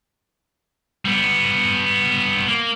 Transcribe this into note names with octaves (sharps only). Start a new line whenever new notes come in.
G3 B3
A#3